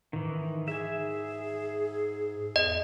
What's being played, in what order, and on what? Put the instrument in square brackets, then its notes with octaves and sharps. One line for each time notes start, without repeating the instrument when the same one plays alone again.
[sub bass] G#2 [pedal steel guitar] D#3 E3
[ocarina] G#4 [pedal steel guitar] E5 G#5
[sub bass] E2 [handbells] D#5